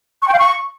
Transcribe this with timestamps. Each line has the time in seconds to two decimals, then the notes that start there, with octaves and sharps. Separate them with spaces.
0.22 C#6
0.28 G5
0.33 F5
0.39 C#6